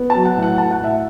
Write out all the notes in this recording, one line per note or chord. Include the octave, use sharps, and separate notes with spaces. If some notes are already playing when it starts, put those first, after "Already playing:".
Already playing: B3
A5
F#3
F#5
A2
F#5
E4 A5
F#5
A2 E5